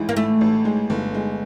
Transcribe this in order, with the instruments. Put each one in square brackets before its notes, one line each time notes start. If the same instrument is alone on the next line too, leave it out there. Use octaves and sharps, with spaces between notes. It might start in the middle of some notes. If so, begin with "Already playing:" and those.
Already playing: [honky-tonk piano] A1 E3 G#3
[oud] A#3
[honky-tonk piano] A2 [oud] A3
[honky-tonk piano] A1
G#3
G1
G#3